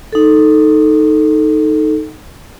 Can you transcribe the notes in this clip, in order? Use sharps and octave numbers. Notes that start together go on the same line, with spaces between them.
D#4 A4